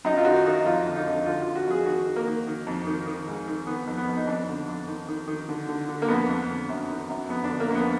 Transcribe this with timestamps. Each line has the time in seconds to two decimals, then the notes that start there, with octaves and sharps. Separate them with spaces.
0.05 F#2 D#4
0.17 F4
0.25 D#3 F#4
0.46 D#3 D#4
0.65 F2 F4
0.85 D3
0.96 D#4
1.06 F2
1.26 D3 F4
1.41 D3 F4
1.55 F#4
1.66 F2
1.71 G#4
1.86 D#3 F#4
2.06 D#3
2.16 A#3
2.27 D#3
2.47 D#3
2.67 F2
2.87 D#3
3.07 D#3
3.28 G#2
3.48 D#3
3.67 D#3 B3
3.87 F2
3.97 B3
4.08 F2
4.17 D#4
4.27 F2 D4
4.48 D3
4.68 F2
4.88 D#3
5.08 D#3
5.28 D#3
5.49 D3
5.69 D3
5.89 D3
6.02 A#3
6.08 F2 B3
6.29 F2
6.49 D3
6.69 F#2
6.90 D#3
7.09 F#2
7.29 F2 B3
7.44 D4
7.50 D3
7.60 A#3
7.70 F2 B3